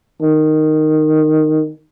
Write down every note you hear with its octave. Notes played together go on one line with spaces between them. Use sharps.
D#3